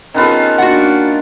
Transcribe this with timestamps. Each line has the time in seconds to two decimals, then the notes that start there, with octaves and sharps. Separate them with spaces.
0.14 D#3 B3 C#4 F4 G#4 A4
0.58 A#3 C#4 D4 F#4 F#5